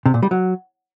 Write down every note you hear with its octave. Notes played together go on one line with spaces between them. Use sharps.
C3
A#2
G3
F#3